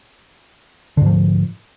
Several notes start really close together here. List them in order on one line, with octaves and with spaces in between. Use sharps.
D3 G#2 F3